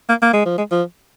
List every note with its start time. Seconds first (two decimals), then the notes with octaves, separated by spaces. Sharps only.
0.09 A#3
0.22 A#3
0.34 G#3
0.45 F3
0.58 G#3
0.71 F3